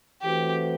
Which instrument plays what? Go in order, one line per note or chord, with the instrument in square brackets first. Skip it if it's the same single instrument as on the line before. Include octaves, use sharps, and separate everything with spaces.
[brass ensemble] E3 A3 C4 F#4 B4 [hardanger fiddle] G4